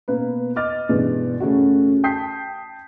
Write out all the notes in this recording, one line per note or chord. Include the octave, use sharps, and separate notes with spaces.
B2 A#3 B3 B4
D#5 D6 F6 A6
G2 B2 E3 G#3 B3
F#2 C#3 A3 F#4
G5 A5 D#6 G6 B6 C7